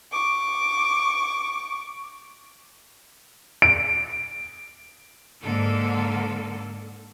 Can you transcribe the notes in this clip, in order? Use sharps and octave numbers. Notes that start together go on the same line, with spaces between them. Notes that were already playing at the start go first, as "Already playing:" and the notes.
C#6 D6
D7
G#2 D3 A#3 A4